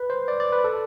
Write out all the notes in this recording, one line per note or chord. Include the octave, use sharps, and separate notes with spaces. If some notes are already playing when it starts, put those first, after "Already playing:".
Already playing: B4
C5
D5
D5
B4
A4